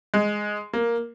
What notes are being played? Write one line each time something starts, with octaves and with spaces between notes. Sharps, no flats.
G#3
A#3